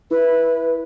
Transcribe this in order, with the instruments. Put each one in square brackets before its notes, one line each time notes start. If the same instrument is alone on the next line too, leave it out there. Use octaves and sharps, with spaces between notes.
[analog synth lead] E4 [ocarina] B4